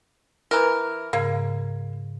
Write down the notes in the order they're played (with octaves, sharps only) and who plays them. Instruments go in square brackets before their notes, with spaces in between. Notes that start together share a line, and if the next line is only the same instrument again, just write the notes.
[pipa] E3 A#4
[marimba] G#2 C#3 G#6 [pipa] A#3